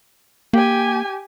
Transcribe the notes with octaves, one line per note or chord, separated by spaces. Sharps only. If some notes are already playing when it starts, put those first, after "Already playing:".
A#3 G4 G#5